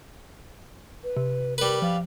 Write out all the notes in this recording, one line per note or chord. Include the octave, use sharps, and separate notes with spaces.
B4
C3
G3 A#4 B4
F3 F5